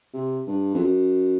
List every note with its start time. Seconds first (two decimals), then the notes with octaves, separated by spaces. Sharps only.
0.14 C3
0.47 G2
0.74 F2
0.80 F#2